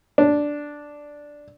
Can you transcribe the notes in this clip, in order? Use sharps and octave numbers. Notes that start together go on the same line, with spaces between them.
D4